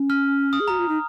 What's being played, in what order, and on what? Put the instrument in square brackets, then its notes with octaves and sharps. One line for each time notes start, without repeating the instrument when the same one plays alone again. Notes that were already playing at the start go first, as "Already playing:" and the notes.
Already playing: [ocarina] C#4
[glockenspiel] F6
D#6
[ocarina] G#4
[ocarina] F#4 [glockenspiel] A#5
[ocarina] F4
D#4